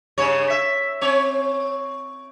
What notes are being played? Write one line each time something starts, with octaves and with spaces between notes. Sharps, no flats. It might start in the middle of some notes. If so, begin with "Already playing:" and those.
G2 C#3 C#5
E5
C4 C#5